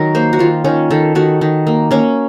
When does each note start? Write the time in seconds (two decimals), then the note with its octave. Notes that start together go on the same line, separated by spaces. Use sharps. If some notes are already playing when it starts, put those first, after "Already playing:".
Already playing: D#3 F#3 F#4 A#4
0.15 A#3 C5
0.33 F#4
0.39 D#3 F4
0.64 D#3 C#4
0.90 D#3 A4
1.15 D#3 F#4
1.41 D#3
1.67 A#3
1.91 A#3 C#4